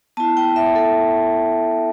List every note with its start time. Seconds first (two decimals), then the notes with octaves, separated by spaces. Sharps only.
0.17 B3 E4 A5
0.37 G5
0.56 E5
0.75 A4